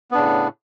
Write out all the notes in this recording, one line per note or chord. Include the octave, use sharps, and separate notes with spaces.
A2 C#3 B3 D4